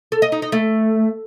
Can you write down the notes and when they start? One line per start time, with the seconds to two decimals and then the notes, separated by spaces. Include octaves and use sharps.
0.12 A4
0.22 D#5
0.32 D#4
0.42 D#4
0.52 A3